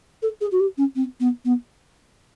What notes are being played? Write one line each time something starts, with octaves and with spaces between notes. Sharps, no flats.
A4
G#4
F#4
G4
C#4
C4
B3
B3